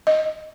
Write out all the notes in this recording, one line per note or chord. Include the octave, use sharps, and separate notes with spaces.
D#5